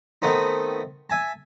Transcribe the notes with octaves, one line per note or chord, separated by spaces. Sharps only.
D#3 A3 B3 C4 D#4
E5 G#5 A5